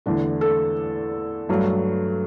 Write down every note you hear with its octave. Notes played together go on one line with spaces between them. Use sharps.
E2 D3 A3
A4
G2 F#3 A3